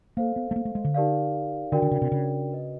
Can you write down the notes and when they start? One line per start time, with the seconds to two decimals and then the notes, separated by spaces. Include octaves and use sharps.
0.17 A#3 A4 C5 F5
0.36 B3
0.51 A3
0.56 A#3
0.65 A3
0.75 G#3
0.84 D3
0.94 D#4 G4 A#4 D5 F5
1.72 D3 D4 F#4 A#4 D5 G5
1.82 D3
1.91 C#3
2.02 C3
2.12 C#3
2.49 F#4 B4 D#5